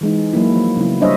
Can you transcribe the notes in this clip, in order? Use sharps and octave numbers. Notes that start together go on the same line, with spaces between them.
E3 G#3 D#4
F#3 A#3 E4
F3 A#3
C#3 F#3 B3 E4
G3 D4 C5 C#5 D#5 E5